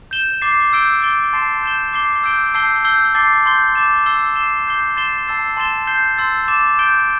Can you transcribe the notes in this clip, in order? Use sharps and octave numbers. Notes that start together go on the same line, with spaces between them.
G6 E7 G7
D6 A6 C7
E6 G6 D7 G7
D6 A6 D7 G7
A5 C6 A6 C7 E7
G6 E7 G7
D6 C7 G7
E6 G6 D7 G7
A5 E6 G6 C7 G7
E6 G6 C7 G7
A5 D6 A6 C7 G7
C6 G6 C7 G7
D6 A6 E7
E6 C7 G7
D6 C7 E7 G7
D6 G6 C7 G7
C6 A6 C7 E7 G7
A5 E6 A6 C7
A5 C6 A6 E7 G7
G6 C7 G7
C6 E6 A6
D6 A6 E7
G6 D7 G7